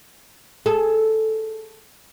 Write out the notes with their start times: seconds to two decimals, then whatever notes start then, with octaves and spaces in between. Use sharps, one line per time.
0.66 G#4 A4